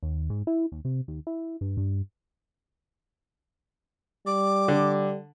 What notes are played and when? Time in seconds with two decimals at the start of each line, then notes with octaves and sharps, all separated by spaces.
0.03 D#2
0.30 G#2
0.47 E4
0.72 D#2
0.85 C3
1.08 D#2
1.27 E4
1.61 G2
1.77 G2
4.26 G3 D6
4.68 D3